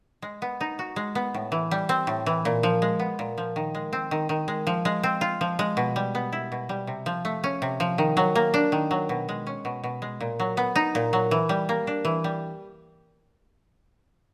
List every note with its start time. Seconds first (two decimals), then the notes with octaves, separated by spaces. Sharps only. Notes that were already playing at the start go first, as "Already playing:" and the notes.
0.22 G#3
0.42 B3
0.61 D#4
0.79 F#4
0.96 G#3
1.15 B3
1.34 A2
1.52 E3
1.71 G3
1.89 C4
2.07 A2
2.26 E3
2.45 A#2
2.63 F3
2.82 G#3
3.00 B3
3.19 A#2
3.38 F3
3.56 D#3
3.75 G#3
3.93 C4
4.11 D#3
4.29 D#3
4.48 G#3
4.67 F3
4.85 G#3
5.03 C4
5.21 F4
5.41 F3
5.59 G#3
5.77 B2
5.96 G3
6.15 B3
6.33 E4
6.52 B2
6.69 G3
6.87 C3
7.06 F3
7.25 A3
7.44 C#4
7.62 C3
7.80 F3
7.98 D#3
8.17 F#3
8.35 A#3
8.54 D4
8.72 D#3
8.91 F#3
9.09 B2
9.29 G#3
9.47 C#4
9.65 B2
9.84 B2
10.02 G#3
10.21 A#2
10.40 F#3
10.57 B3
10.76 D#4
10.95 A#2
11.13 F#3
11.31 E3
11.49 G3
11.69 A#3
11.87 D4
12.05 E3
12.24 G3